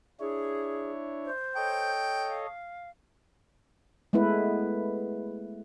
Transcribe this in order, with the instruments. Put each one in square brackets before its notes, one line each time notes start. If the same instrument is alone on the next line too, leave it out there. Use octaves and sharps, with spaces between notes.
[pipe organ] D4 E4 C#5 [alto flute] G#4
[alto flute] C5
[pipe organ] A4 C#5 D#5 [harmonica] G5
[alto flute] F5
[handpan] G#3 A3 B3 E4 B4